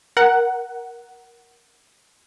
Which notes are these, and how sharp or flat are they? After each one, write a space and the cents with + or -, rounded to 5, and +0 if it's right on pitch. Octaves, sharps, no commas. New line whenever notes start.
A#4 +10 F#5 +10